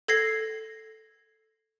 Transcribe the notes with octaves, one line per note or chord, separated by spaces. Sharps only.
A4 G#6 A#6 C7